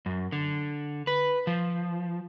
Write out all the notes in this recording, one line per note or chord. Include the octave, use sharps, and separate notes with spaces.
F#2
D3
B4
F3